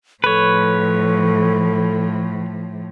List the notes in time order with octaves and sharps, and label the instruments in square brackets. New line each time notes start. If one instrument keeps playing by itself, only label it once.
[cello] A2 F3 [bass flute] A4 [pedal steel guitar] B4 C#5